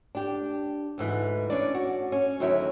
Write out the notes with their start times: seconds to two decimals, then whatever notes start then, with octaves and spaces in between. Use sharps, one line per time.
0.15 D4 G4
0.98 D2 G#2 E3
1.50 C#4 D4 D5
1.75 F#4
2.12 C#4
2.40 D2 D#3 F#3 E4 C#5 E5